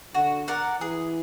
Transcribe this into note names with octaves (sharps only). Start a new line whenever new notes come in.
D3 F#4
A#4 D5 F#5
E3 G#4